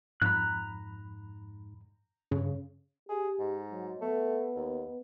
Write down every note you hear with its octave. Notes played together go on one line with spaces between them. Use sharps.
F2 G#2 A#5 B5 F#6
G2 C#3
G4 G#4
G#2
F#3
A3 B3
D#2